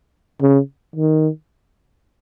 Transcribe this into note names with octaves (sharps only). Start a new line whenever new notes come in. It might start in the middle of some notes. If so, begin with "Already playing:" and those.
C#3
D#3